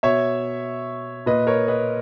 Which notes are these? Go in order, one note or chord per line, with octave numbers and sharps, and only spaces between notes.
B2 C#5 E5
A#2 B4 D#5
A#4 C#5
B4 D#5